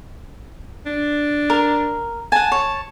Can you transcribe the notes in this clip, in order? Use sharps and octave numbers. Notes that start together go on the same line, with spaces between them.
D4
A#4
F#5 G#5 A5
C#5